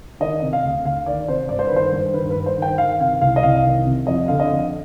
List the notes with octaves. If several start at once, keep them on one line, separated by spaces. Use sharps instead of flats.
D#3 D#5
C3
F5
D2
D2 F5
D#3 D5
C3 C5
G2 D5
C5
B4
D#3
C5
G2
D#3 B4
B4
G2
C5
D#3 G5
D#3 F5
C3 F5
C2 F5
D#5
C2 F5
D#3
C3
F2 D#5
D3 F5
D#5
F2